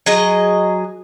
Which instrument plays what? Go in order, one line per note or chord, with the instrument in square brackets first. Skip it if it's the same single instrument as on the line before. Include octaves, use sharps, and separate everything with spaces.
[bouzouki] F#3 G#4 D#5